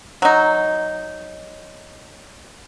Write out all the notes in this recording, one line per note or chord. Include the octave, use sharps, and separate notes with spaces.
F#3 D#4